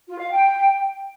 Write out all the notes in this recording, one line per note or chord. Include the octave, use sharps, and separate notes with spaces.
F4
F5
G5